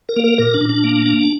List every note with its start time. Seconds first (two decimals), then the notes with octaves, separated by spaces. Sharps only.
0.09 A#4
0.16 A#3
0.24 A#4
0.38 A#2 A#4
0.54 D4
0.61 A#2
0.69 D4
0.84 A#3
1.06 A#3